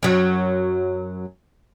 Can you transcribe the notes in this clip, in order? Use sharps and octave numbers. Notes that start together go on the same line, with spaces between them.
F#2 F#3